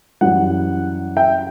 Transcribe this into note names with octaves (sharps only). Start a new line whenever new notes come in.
F#2 E3 G3 F#5
E5 G5